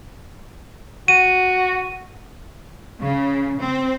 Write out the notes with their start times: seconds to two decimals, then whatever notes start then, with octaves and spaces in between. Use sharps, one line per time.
1.08 F#4 D#7
3.01 C#3
3.59 C4